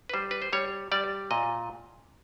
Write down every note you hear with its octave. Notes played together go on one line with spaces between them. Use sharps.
B4
G3 C5
B4
C5
G3 C#5
G3 D5
A#2 D#5